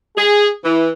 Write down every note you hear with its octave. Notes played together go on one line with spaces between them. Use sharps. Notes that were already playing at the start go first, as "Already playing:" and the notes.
G#4
E3